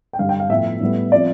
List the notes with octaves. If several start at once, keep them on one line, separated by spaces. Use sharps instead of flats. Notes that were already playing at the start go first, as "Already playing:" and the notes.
G5
G2 D3 G3 F5
G5
F5
A2 F3 B3 E5
A2 G3 B3
F3 C4 D5